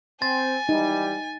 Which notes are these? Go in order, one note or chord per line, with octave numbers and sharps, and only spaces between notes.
C4 G#5 C6 A6
E3 G3 D#4